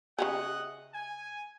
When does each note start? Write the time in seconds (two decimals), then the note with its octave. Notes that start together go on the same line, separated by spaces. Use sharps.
0.19 C#3 G4 G#4 D#5 E5 F#5
0.93 G#5